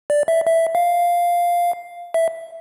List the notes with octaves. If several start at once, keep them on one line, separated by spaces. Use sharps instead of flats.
D5
E5
E5
F5
E5